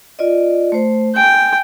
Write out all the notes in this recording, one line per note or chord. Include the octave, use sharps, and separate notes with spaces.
F4 D5 D#5
A3 C5
G5 G#5